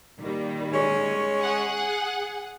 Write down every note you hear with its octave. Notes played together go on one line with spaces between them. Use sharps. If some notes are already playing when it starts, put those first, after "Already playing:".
A#2 D#3 G3
G#3 C#4 C#5
G#4 F#5